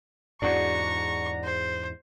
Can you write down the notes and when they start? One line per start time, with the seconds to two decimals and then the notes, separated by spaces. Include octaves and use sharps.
0.42 E2 G#2 D4 F#4 A#5 C#6
1.44 C5